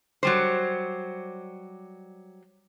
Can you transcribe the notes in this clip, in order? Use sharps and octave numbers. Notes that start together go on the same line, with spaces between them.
F#3 G3 C5